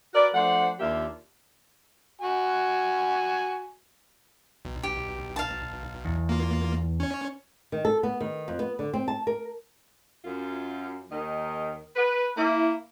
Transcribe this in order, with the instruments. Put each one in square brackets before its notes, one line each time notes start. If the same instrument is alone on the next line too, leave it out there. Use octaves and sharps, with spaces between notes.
[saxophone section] F#4 A#4 B4 D5
F3 A3 D4 C5 F#5
D#2 A#3 D4 F4 G4 E5
[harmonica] F#4 G#5
[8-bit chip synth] B1
[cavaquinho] G4
F5 A5
[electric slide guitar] E2
[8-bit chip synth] A#3 F4
C#4 C#5
[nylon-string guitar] D#3
A4
B3
D#3
F2
B3
D3
C4
A5
A#4
[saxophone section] F#2 F4
D#2 D#3 A#4 D#5
B4
A#3 E4